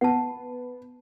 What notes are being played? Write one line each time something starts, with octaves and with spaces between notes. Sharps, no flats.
B3 F#5 A5